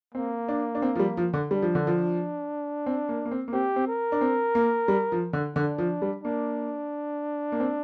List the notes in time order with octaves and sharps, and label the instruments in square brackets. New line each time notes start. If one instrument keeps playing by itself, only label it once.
[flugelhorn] A#3 [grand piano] C4
[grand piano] D4
D4
C4
F3
G3
F3
D3
[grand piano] G3 [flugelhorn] D4
[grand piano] F3
D3
F3
C4
A#3
A#3
C4
A#3
[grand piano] C4 [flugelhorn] G4
[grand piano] C4
[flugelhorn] A#4
[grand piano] D4
C4
A#3
G3
F3
D3
[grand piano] D3 [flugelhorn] D4
[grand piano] F3
G3
[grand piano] A#3 [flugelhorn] D4
[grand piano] A#3
C4